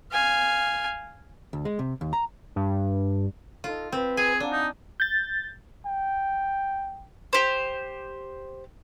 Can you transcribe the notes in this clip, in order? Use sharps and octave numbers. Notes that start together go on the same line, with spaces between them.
F5 G#5
D2
G#3
C3
D#2
A#5
G2
D#4 F4 A4
C4 B4
G#4 G#5
D4 F5 F#5 A#5
D#4
G6 A6
G5
G4 C5